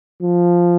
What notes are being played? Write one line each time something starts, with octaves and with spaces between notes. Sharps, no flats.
F3